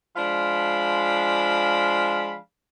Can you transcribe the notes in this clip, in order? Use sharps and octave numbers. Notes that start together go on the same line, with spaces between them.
F3 G#3 D4 F5 B5